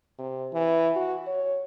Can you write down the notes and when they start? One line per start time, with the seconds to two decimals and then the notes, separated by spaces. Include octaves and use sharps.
0.19 C3
0.53 E3
0.96 F#4
1.27 C#5